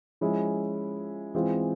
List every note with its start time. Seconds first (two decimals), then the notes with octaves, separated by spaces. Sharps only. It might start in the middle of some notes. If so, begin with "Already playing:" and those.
0.21 F3 G#3 C#4 E4
1.34 E3 G#3 C4 F4